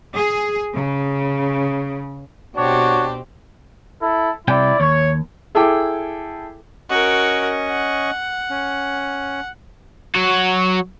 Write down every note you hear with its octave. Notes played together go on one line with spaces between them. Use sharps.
G#4
C#3
B2 C4 D4 F#4 G4 C#5
E4 A4
C2 C3 E4 D5 G5
D#2 C#5
E4 G#4 A4 G5 D6
C#4 F#4 A#4 D#5 C#6
F#5
C#4
F#3 F#4